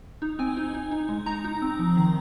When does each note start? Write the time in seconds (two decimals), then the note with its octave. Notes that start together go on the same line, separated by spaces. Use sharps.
0.22 D#4
0.39 C4 G#5
0.57 D#4
0.74 D#4
0.91 D#4
1.09 G#3
1.26 D#4 A#5
1.44 D#4
1.62 C4
1.79 F3
1.97 D#3